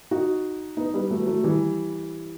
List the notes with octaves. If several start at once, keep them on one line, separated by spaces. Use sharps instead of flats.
D#4 F#4
B3 D#4
G3 B3
F#3 A3
F#3 A3
E3 G3